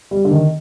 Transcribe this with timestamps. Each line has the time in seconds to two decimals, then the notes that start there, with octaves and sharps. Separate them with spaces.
0.11 G3
0.25 D3
0.31 D#3